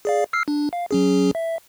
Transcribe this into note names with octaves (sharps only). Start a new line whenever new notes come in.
G#4 D5 F5
E6 F6 C7
D4
F5
F#3 C#4 G#4
E5